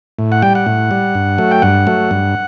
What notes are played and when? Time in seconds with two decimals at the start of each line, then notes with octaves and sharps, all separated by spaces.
0.19 A2
0.32 F#5
0.42 G3 G5
0.55 F#5
0.66 A2
0.91 G3
1.15 G2
1.38 F#3 A3
1.51 G5
1.62 G2 F#5
1.87 F#3 A3
2.11 G2